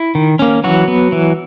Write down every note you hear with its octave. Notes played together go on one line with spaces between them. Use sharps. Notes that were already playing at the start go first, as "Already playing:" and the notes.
Already playing: E4
D#3
A#3 C#4
E3 F#3 F#4
B3
E3